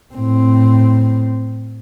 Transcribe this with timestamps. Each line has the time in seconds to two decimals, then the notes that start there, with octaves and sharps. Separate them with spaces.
0.14 A2 C4